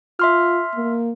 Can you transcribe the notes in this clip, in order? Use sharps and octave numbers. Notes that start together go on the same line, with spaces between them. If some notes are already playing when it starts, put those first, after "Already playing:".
F4 E5 C6 F6
A#3